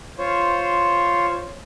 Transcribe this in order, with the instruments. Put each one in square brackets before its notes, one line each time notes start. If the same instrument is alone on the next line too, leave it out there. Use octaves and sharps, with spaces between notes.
[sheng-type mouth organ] F4 C5 C#5